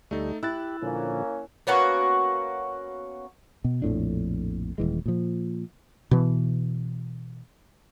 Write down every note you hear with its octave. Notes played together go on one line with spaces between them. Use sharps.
D2 G3 A3 D#4 A4
E4 G4 E6 F#6 A6
A#2 D3 F3 A#3 C#4
A#3 B3 C#4 F#4
B2
A#1 F2 A2 D4
D#1 E3 G#3
A#2 F3
B2 E3